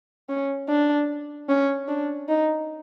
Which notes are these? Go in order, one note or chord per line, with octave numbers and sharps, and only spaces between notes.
C#4
D4
C#4
D4
D#4